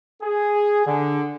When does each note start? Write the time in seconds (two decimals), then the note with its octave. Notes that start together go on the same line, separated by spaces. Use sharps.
0.22 G#4
0.87 D3